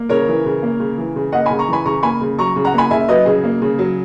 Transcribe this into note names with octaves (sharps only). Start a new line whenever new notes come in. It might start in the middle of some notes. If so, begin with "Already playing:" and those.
Already playing: A#3
C#3 A#4 C#5
E3
C#3
A#3
C#3
E3
C#3
A#3 D#5 F#5
C#3 G#5 B5
A#5 C#6
E3 G#5 B5
C#3 A#5 C#6
A#3 G#5 B5
C#3
F#3 A#5 C#6
C#3
F#5 A#5
A#3 G#5 B5
C#3 E5 G#5
F#3 B4 D#5
C#3 G#4
A#3
C#3
F#3